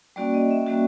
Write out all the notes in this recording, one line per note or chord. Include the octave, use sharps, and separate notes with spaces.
G3 A#3 C#4 F#4 D5
D#5
E5
G3 A#3 C#4 F#4